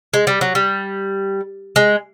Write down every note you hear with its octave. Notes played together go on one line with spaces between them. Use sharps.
G#3
G3
F#3
G3
G#3